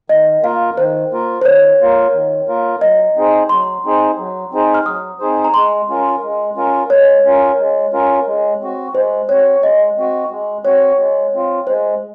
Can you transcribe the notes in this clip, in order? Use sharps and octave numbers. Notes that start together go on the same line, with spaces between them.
D#3 D#5
A#3 F4 A#4 F5
D#3 C5
A#3 F4 A#4
C5
D#3 C#5
A#3 F4 A#4
D#3
A#3 F4 A#4
F#3 D#5
C4 D#4 G#4 C5
F#3 C6
C4 D#4 G#4 C5
F#3
C4 D#4 G#4 C5
F6
F#3 D#6
C4 D#4 G#4 C5
A#5
G#3 C6
C#4 F4 A#4
G#3
C#4 F4 A#4
G#3 C#5
C#4 F4 A#4
G#3
C#4 F4 A#4
G#3
C4 F#4
G#3 C5
C4 F#4 C#5
G#3 D#5
C4 F#4
G#3
C4 F#4 C#5
G#3
C4 F4
G#3 C5